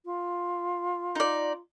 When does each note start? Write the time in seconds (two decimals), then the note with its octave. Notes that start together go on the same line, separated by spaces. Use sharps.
0.05 F4
1.15 D#4 D5